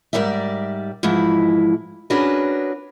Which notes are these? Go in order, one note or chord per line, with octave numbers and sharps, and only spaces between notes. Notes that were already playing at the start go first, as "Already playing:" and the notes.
G#2 C#3 G3 A#4 D5 E5
G#2 E3 F3 G#3 E4
C#4 D4 F#4 G#4 A#4 B4